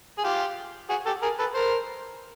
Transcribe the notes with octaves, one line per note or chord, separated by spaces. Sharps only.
G#4
F4 G4
F#4 G#4
G4 A4
G#4 A#4
A4 B4
A#4 C5